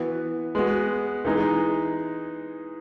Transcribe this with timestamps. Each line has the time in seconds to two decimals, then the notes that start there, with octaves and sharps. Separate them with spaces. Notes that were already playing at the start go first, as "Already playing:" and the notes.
Already playing: E3 B3 F#4
0.55 G#3 B3 F#4
1.25 E3 G#3 D#4 G#4